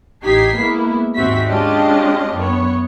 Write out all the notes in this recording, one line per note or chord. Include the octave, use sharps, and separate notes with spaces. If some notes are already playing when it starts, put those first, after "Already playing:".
A1 D#4 G4 G#6 B6 C7
G#3 A#3 B3 E4
D#2 G#2 C4 F#4 E5 B6
G#3 C#4 D4 F4 G4 D#5
F#2 B3 C#5